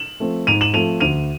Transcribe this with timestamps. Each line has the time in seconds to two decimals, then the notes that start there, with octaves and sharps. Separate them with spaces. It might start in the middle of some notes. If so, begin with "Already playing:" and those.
Already playing: E7 F#7
0.20 F3 A3 C4
0.47 G#2 D#7 F7
0.61 E7 F#7
0.73 F3 A3 C4 D#7 F7
1.00 D2 D#7 F7